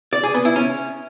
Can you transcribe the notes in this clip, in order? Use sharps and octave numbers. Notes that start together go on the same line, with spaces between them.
D5
G#4
B3
E4
C#4